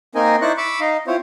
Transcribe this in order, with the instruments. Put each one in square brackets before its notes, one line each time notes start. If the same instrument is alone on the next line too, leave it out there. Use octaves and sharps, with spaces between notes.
[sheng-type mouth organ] A#3 C4 D#4 A#4 D#5 G#5
D#4 E4 C5 D5 C#6 F#6
B5 C#6 D6 E6
D#4 D#5 F5
C4 E4 F4 C5 C#5